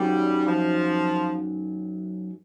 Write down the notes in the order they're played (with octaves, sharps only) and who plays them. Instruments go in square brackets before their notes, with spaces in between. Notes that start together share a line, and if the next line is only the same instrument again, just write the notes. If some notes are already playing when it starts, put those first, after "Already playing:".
Already playing: [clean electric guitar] F#2 D#3 F#3 [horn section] G3
[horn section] F3